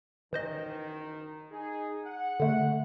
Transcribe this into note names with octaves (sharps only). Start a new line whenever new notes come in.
F#1 D#3 E3 C5 D#5
D#4 G#4
F#5
D3 A3